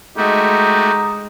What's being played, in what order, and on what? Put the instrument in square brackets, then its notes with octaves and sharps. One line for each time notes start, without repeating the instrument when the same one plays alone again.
[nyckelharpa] G#3 [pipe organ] A3 F#4 [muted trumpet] D#4 [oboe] G4